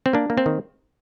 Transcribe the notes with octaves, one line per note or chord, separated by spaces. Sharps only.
C4
A#3 D4
A#3
C4
D#3